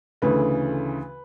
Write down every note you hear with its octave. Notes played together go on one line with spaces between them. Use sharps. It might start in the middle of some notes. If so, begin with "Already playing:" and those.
D2 C#3 E3 A3 B4